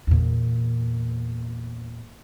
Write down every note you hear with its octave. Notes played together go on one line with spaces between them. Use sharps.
E2 A#2